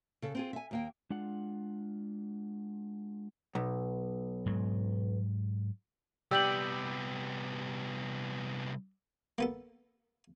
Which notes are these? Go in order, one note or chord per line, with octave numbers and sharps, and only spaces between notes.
C#3 A4
C4 F4 G#4
E5 G#5
D#2 A#3 G5
G#3 D4 F4 F#5
B1
G#2 F#3
C2 B3 G4 D5 G5 E6 G6 F#7
A#3 B3 A4